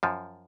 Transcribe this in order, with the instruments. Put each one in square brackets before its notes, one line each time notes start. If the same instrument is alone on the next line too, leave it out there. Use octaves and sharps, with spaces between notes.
[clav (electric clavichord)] F#2 F3